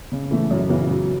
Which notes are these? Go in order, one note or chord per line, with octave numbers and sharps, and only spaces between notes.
C#3
E3 A3
F#2
C#3 E3 B3 F#4
F#3